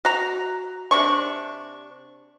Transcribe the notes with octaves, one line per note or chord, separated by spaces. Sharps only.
F#4 A#5
C3 D4 C#6